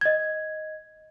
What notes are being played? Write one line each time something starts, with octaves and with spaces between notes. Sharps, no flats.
D#5 G#6